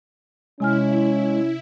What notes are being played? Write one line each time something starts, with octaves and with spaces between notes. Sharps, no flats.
C3 G#3 C#4 E4 G#5 F6